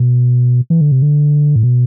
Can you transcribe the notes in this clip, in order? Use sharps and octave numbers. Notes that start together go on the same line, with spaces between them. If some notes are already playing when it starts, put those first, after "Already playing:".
Already playing: B2
E3
D3
C3
D3
A2
B2